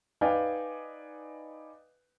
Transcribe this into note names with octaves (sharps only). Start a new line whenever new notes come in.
D#4 B4 D5 F5 G5 G#5